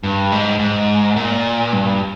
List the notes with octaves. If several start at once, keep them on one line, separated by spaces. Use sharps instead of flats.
G2
G#2
G#2
A#2
G2